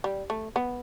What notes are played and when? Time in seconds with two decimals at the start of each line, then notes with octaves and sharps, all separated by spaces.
0.04 G3
0.30 A3
0.56 B3